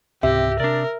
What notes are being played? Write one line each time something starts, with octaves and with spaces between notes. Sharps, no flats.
C#2 G#2 C3 G4 E5
C3 D4 A#4 D5